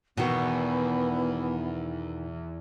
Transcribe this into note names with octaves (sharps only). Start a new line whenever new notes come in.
E2 B2 D#3 B3 F#4